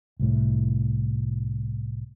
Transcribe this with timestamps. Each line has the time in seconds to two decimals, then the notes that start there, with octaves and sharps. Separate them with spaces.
0.19 C2 A2